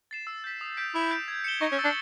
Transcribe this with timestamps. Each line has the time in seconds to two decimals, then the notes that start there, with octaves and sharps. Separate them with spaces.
0.11 A6 C7 E7
0.27 E6
0.44 G6 B6
0.61 D#6
0.77 G6 B6 D7
0.94 E4 D#6
1.11 G6 B6 D7
1.28 G#6
1.44 C#7 E7 G7
1.61 D#4 C#6
1.72 C#4
1.78 E6 A6
1.84 D4